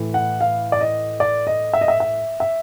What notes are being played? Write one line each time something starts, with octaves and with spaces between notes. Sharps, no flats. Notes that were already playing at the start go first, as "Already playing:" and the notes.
Already playing: A2 E3
F#5
F5
D5
D#5
D5
D#5
E5
D#5
E5
E5
E5